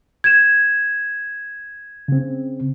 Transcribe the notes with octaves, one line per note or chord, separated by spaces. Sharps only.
G#6 E7
C#3 C4